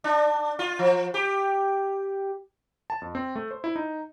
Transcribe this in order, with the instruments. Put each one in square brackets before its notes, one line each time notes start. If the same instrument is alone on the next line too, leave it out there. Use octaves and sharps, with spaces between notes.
[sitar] D4
F4
F3
G4
[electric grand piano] A5
F2
C4
A3
C5
E4
D#4